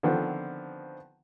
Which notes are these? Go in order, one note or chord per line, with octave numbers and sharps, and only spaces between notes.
D3 D#3 F3 B3 C4